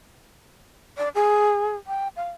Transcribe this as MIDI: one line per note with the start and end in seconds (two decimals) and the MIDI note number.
0.98 1.08 74
1.15 1.76 68
1.87 2.08 79
2.16 2.30 77